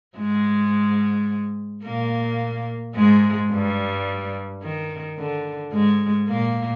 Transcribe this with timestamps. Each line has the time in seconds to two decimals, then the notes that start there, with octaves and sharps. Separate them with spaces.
0.18 G#2 G#3
1.84 A#2 A#3
2.95 G#2 G#3
3.51 G2 G3
4.62 D#3
5.18 D3
5.72 G#2 G#3
6.28 A#2 A#3